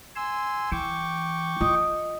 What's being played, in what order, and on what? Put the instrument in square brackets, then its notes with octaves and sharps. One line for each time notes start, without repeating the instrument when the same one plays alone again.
[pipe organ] G#5 C6 E6
[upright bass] E3 [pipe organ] G5 C#6 D6
[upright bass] F4 [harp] D#5